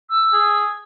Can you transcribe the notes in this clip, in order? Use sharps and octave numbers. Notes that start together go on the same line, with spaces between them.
E6
G#4